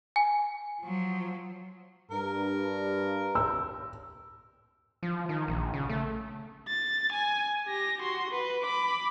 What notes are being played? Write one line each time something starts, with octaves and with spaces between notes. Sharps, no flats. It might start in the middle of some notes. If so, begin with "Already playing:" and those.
G#5
F3 F#3
G2 A#4
E6
F3
D#3
A#1
C#3
A3
A6
G#5
G4 A#6
F#4 C6
B4
B5 D6